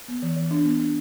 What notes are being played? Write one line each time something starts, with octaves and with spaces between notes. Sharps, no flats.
B3
E3
E3
D4
B3
D4